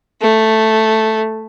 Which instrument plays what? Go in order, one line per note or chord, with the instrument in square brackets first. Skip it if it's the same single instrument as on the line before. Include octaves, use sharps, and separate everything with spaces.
[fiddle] A3